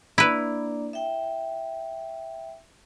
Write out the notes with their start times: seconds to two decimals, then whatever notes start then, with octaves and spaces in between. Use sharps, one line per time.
0.18 A#3 D4 E4 B4 D5
0.93 E5 G5